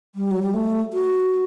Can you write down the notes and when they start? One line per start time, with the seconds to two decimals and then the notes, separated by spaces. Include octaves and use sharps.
0.15 G3
0.31 F#3
0.42 G3
0.54 A3
0.93 F#4